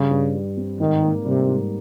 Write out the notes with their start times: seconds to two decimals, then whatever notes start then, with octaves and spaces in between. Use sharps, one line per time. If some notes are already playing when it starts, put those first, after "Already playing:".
Already playing: G2 C#3 G3
0.11 G2
0.34 G3
0.57 C4
0.80 G#2 D#3
1.03 A#3
1.25 C3 G3
1.48 G#2